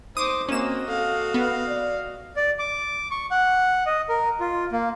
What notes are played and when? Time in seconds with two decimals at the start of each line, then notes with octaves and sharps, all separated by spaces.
0.17 D#4 C5 D6 D#6
0.49 A#3 C4 C#4 F#4 D#5 E7
0.88 A4 F5
1.34 B3
1.68 D5
2.36 D5
2.59 D6
3.11 C#6
3.31 F#5
3.86 D#5
4.09 A#4
4.40 F4
4.72 A#3